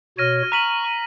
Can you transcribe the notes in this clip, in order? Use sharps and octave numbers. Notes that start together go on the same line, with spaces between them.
B2 F#4 C#5 F6 A#6 D#7
A#5 C#6 F6 B6 D#7 F#7